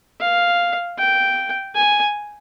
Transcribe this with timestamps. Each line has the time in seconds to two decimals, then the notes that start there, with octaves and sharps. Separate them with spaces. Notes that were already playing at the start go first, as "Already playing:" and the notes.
0.21 F5
0.98 G5
1.75 G#5